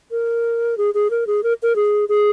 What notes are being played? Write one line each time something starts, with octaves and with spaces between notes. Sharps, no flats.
A#4
G#4
G#4
A#4
G#4
A#4
A#4
G#4
G#4